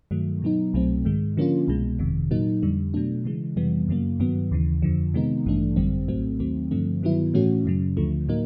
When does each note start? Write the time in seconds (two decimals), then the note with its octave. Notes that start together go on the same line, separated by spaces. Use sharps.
0.11 G2 D#3 F#3 A3
0.42 B2 F#3 B3 D#4
0.74 C2 B2 F#3 A3 C4
1.05 G#2 D#3 G#3
1.37 D3 F3 A#3 C#4 F4
1.68 C2 B2 G#3
1.99 G1 F2 C3 D#3
2.31 A#2 F#3 A#3 D#4
2.62 F2 D3 G3
2.94 B2 F#3 A3 D4
3.25 C#3 E3 G#3
3.56 F2 C3 E3 G3 B3
3.88 F#2 C#3 F#3 A#3
4.20 G2 D#3 F#3 B3
4.51 D#2 C#3 E3
4.82 F2 D3 F3
5.14 C3 D#3 G#3 B3 D#4
5.46 A1 G2 E3 A3 D4
5.76 G#1 F#2 D3 G3 C4
6.08 A#1 A2 F#3 A3 C4
6.40 D#2 D#3 F#3 A3 C4
6.71 G2 D3 F3 A3 C4
7.02 G2 D#3 F#3 B3 E4
7.34 A2 E3 A3 C#4 F#4
7.65 F#2 C#3 F#3
7.97 D2 D3 F3 A3
8.28 A2 F#3 A#3 D#4